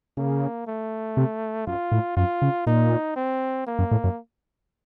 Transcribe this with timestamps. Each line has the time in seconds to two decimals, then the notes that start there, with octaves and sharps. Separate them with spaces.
0.17 C#3 A#3
0.67 A3
1.17 C3
1.67 F#2 F4
1.92 A2
2.17 F#2 F4
2.42 C#3
2.67 A#2 D#4
3.16 C4
3.67 A#3
3.79 F#2
3.91 A2
4.04 F#2